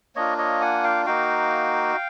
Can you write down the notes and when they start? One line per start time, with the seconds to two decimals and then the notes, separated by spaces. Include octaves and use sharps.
0.16 A#3 D4 F4 C#5 D#5
0.38 C#5 D#5
0.61 F#5 G#5
0.84 F5 G5
1.06 A#3 D#4 F#4 F5 G5